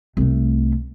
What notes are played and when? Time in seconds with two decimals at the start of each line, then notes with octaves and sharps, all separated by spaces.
0.17 C2 A3